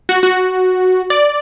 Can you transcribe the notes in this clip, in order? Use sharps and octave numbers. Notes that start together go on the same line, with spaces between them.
F#4
F#4
D5